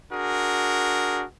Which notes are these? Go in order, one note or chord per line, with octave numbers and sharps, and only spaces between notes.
D4 F#4 G#4 A#4